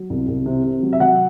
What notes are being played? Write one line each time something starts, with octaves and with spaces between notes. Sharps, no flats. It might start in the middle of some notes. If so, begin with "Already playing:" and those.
Already playing: F#3
C2
C2
C3
C3
F#3
E5
F#3 F#5